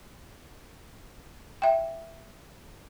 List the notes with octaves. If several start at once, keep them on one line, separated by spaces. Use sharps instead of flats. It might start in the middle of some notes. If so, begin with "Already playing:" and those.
E5 G5